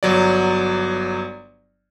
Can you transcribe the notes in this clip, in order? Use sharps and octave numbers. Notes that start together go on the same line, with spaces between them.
G1 F#3 D5